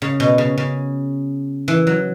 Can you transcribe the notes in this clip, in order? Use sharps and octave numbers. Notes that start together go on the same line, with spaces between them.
C#3
B2
C#3
C#3
E3
F#3